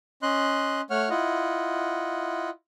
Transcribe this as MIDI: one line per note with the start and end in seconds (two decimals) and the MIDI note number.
0.23 0.81 61
0.23 0.81 75
0.23 0.81 84
0.23 0.81 90
0.90 1.09 57
0.90 1.09 73
0.90 1.09 78
0.90 1.09 89
1.10 2.50 64
1.10 2.50 65
1.10 2.50 75
1.10 2.50 78